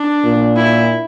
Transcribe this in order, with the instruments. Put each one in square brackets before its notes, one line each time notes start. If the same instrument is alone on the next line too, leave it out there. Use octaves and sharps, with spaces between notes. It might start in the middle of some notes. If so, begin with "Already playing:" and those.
Already playing: [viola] D4
[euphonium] A#2
[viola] E4